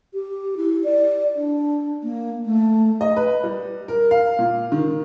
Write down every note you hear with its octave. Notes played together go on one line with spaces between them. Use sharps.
G4
E4
D5
D4
A#3
A3
D#5
B4
G3
A#4
F5
A#2
D#3